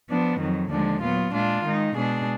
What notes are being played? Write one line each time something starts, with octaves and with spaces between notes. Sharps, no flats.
F3 B3 D4
F2 D#3 F#3
D#2 D3 F3 G#3 D4
A#2 F#3 B3 F4
A#2 G#3 D4 F4
D#3 G#3 D#4
B2 G#3 D4 G#4